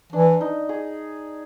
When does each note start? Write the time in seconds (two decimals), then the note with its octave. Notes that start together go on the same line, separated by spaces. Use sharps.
0.12 E3 D4
0.41 D#4
0.69 G#4